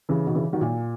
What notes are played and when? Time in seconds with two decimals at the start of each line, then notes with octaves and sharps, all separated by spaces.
0.09 C#3 E3
0.26 B2 D#3
0.35 C#3 E3
0.53 D#3 F#3
0.61 A#2